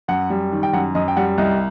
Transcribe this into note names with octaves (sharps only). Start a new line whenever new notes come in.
F#2 F#5
G3
D#3
G5
F#2 F#5
F#2 D#5
G5
G3 F#5
C2 D#5